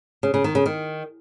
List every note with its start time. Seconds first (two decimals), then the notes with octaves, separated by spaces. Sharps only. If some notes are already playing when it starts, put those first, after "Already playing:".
0.23 C#3
0.34 C#3
0.44 D#3
0.55 C#3
0.66 D#3